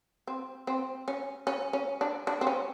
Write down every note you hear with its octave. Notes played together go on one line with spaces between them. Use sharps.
C4
C4
C#4
C#4
C#4
D4
D4
C4
C#4